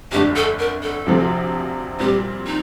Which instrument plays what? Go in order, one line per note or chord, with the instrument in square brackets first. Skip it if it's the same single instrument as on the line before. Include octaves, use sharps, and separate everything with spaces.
[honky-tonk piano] G1 F2 D3 A3 D4 [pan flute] G4
[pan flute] A4
A#4
A4
[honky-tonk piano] D2 C3 F3 C4
[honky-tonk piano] A#2 G3 C4 [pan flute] G4
[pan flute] D#4